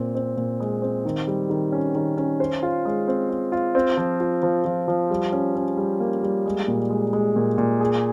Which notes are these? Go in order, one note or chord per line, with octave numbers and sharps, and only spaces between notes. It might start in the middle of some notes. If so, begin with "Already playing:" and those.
Already playing: A#2 C4
C4
A#2
G#3
C4
D#3
G3
D#3
C#4
D#3
C#4
C5
F4
G#3
C4
F4
F4
C4
F3
F4
F3
F3
F3
G3
C#4
C#4
G3
A#3
G3
G#3
A#2
G#3
G#3
A#2
A#2
G#4